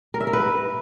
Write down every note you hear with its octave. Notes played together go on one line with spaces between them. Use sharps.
A#4
E5
A#4
B4